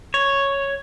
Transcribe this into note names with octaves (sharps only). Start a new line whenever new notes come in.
C#5